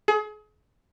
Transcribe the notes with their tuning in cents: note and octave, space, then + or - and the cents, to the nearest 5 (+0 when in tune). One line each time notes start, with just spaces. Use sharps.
G#4 +35